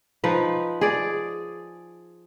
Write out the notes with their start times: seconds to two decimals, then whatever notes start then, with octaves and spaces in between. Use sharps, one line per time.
0.24 F3 D#4 B4
0.81 G#4 D5